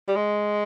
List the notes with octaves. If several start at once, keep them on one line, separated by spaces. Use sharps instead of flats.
G3
G#3